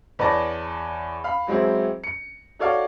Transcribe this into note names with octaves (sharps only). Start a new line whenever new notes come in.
E2 B4 C#5 D5 A5 A#6
F5 B5
E3 F#3 G#3 C4 E4
C#7
D#4 F#4 A4 C#5 D5 F5